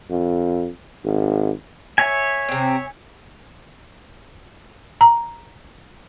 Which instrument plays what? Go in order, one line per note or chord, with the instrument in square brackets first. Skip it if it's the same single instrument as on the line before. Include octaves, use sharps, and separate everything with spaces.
[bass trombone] F2
G#1
[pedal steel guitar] C#5 E5 G#5
[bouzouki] C3 C4
[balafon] A#5